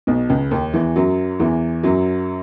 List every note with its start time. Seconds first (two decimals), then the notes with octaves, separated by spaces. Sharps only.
0.07 B1 B2
0.30 C#2 C#3
0.51 D#2 D#3
0.74 E2 E3
0.96 F#2 F#3
1.40 E2 E3
1.83 F#2 F#3